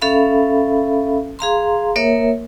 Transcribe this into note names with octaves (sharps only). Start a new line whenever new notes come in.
C#4 A4 E5 F5 B5
G#4 F5 A#5 C6
A#3 A#4 C#5 E5